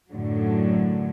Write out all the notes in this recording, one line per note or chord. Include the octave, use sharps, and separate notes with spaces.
F#2 A2 D3 F#3